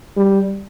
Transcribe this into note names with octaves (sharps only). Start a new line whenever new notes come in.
G3